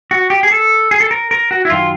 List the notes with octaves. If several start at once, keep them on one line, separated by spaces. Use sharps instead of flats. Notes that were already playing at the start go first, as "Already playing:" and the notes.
F#4
G4
G#4
A4
G#4
A4
A#4
A#4
F#4
E4
F#2 D#3 F4